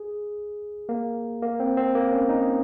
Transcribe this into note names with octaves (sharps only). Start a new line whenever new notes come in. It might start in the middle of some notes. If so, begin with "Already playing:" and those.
Already playing: G#4
A#3
A#3
C4
C4
A#3
C#4
D#4